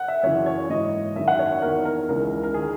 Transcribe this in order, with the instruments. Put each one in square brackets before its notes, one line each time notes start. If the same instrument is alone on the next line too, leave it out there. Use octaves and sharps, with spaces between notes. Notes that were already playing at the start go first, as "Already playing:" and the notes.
Already playing: [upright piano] F#5
E5
F#2 C#3 E3 C#5
C#5
G#2 E3 D#5
F#2 D#3 E5
F#5
C#5
E2 D#3 A#4
A#4
C#2 C#3 E3 A#4
A#4
D#3 G#4